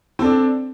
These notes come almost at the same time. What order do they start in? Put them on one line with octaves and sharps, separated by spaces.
C4 A4 D4